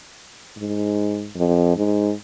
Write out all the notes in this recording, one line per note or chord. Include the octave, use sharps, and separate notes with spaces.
G#2
F2
G#2